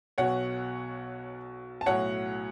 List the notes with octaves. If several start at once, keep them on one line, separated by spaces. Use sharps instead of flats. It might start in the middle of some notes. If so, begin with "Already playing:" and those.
B1 B2 F#3 C#5 F#5
A5
B1 A2 F#3 C#5 F#5